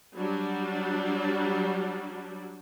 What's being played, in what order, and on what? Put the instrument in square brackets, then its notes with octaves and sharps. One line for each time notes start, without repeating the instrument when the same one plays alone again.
[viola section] F#3 G3 D4